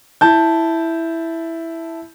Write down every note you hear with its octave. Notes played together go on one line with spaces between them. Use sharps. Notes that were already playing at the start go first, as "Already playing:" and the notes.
E4 A5 G6